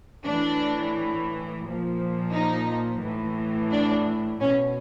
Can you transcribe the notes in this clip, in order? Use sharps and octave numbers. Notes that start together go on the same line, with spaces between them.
A2 E3 D4
A#2 F3
D#4
A2 E3
D4
B2 C#4